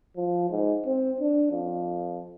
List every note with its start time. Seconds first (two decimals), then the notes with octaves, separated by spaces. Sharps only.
0.17 F3
0.50 G#2
0.86 C4
1.21 D4
1.52 F2